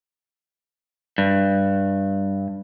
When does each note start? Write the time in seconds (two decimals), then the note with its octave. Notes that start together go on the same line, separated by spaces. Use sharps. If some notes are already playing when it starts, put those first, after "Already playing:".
1.18 G2